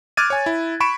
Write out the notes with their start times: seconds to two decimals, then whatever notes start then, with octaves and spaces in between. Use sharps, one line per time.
0.17 D6 F6 F#6 G#6 A6 D#7
0.30 C#5 G#5
0.46 E4
0.80 B5 C#6 D7 E7